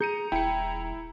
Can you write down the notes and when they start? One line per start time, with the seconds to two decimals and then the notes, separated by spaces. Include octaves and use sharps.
0.01 G#4 A#5 G6 C#7 D#7
0.32 D#1 E4 G5 C#7